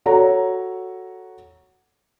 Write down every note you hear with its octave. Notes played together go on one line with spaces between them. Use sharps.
F#4 A4 C#5 A#5